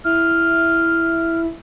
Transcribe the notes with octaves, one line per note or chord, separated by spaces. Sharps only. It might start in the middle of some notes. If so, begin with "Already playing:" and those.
E4 F6